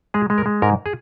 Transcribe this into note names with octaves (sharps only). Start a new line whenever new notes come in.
G#3 G#4
G#3
A#4
G#3
G#2 A#4
G#4